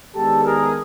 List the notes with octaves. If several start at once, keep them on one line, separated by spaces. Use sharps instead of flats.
D#3 G#3 B3 D4 G4 A4
G#4 A#4